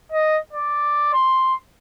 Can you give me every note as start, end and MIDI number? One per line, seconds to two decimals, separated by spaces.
0.12 0.39 75
0.53 1.13 74
1.13 1.54 84